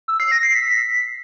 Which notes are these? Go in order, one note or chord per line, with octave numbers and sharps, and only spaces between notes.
E6
C7
A#6
C7
B6